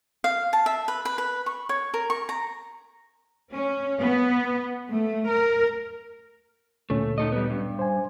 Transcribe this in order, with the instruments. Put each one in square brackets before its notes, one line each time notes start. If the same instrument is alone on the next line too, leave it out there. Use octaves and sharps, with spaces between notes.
[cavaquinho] F5
A5
E5
B4
B4
B4
C#6
C#5
A#4
C#6
A#5
[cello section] C#4
B3
A3
A#4
[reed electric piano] D2 A#2 C#4 [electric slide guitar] A3
[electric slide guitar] D#4 A4 D#5
G3 B3
G2
[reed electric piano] C5 G#5